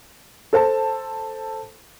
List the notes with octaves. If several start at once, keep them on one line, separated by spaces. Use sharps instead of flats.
A4 C5 A5